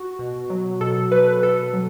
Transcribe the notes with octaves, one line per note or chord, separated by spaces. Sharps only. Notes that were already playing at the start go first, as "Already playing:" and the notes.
Already playing: F#4
B2
F#3
B2 A4
F#3 B4
B2 A4
F#3